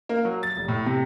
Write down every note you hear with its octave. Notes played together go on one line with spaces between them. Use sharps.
A#3
F#3
A6
F1
A2
C3